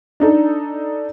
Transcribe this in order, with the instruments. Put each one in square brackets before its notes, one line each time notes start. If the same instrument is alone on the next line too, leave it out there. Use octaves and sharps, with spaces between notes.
[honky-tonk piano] D4 D#4 A4